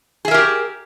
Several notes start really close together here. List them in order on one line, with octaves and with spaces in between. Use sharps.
G#4 E5 A#4 G4